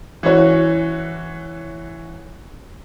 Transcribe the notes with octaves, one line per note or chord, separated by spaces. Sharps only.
E3 C#4 F#4 C#5